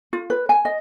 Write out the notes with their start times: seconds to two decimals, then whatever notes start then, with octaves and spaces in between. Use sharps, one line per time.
0.13 F4
0.30 B4
0.49 G#5
0.65 D#5